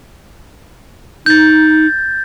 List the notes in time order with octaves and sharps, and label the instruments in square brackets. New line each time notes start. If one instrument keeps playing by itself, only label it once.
[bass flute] D#4 [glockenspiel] G6 A6